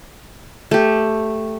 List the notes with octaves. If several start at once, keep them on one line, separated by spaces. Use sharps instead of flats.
A3 G4